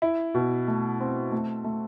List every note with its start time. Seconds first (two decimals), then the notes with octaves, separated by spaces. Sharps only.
0.02 E4
0.35 B2
0.68 A3
1.01 C4
1.32 A3
1.64 A3